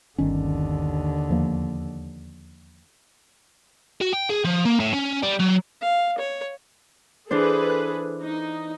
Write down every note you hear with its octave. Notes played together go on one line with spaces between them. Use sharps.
G1 D#2 D3 D#3 C#4
E2 F3 A#3
F#4
G5
G#4
F3
A#3
A2
C#4
G3
F#3
F5
C#5
E3 D4 G#4 A4 B4 C5
F#6
D#4